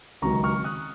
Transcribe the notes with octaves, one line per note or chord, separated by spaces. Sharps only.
C#2 C3 D#3 F#3 A#5 C#6
C#6 F6
D#6 F#6